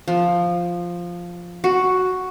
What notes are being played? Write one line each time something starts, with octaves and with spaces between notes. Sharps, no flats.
F3
F#4